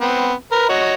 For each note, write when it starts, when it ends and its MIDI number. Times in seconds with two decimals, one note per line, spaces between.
0.01 0.33 59
0.01 0.33 60
0.52 0.67 70
0.52 0.67 71
0.69 0.94 66
0.69 0.94 73
0.69 0.94 75